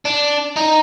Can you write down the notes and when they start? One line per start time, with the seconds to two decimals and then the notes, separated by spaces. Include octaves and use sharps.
0.05 D4
0.56 D#4